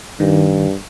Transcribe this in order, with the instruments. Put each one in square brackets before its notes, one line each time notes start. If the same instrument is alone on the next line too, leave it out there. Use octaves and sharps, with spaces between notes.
[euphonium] G2 [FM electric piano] D#3